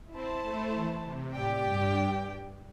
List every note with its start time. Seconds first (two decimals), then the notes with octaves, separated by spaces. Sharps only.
0.13 C4 E4 C5 A5
0.43 A3
0.74 E3
1.03 C3
1.34 A2 G4 D5 G5
1.65 G2
1.95 G2